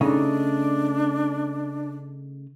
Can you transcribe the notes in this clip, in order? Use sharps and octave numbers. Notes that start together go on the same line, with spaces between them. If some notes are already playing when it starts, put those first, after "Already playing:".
C#3 A3 D4 D#4